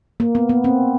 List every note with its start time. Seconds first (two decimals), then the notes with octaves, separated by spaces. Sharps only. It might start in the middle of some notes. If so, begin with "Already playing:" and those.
0.20 A#3
0.35 B3
0.49 B3
0.64 C4